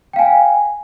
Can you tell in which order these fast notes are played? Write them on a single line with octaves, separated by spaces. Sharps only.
G5 F5 G#5